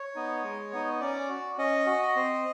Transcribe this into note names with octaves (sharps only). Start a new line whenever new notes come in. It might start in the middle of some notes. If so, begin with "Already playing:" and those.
Already playing: C#5
B3 D#4
G#3
B3 D#4
C#4 D5
F#4
C#4 D#5
F#4
C4